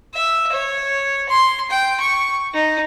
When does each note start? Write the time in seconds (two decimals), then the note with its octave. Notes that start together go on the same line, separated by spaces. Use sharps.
0.14 E5
0.52 C#5
1.29 C6
1.70 G5
2.00 C#6
2.54 D#4